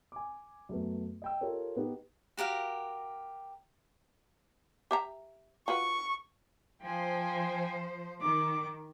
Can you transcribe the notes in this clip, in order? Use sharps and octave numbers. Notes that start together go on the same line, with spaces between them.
G#5 D6
F#2 A3 B3
D#5 G5 E6
F4 G4 A4 A#4 C#5
B3 D#4 G4
F#4 G4 A#4 F5
G4 E5 A#5
F4 F#4 B4 C#6
F3 C5 G5 G#5
D#3 D6